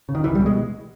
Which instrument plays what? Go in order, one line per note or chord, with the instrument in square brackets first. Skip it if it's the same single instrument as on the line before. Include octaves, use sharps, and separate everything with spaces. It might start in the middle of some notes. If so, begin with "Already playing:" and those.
[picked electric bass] C#3
D#3
C#2 E3
G3
B2
G#3